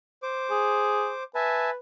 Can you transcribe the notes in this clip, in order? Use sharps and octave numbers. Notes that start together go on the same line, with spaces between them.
C5 D6
G#4
B4 E5 G#5 A5